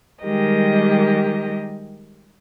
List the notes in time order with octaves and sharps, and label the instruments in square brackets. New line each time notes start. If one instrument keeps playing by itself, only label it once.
[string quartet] D#3 G3 G#3 G4 A#4 D#5